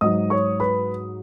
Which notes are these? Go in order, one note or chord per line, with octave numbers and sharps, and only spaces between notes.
G#2 F#3 D#5 D#6
C#5 C#6
B4 B5